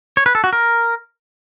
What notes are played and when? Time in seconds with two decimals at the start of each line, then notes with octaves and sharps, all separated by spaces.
0.17 C#5
0.26 B4
0.35 A4
0.44 F#4
0.53 A#4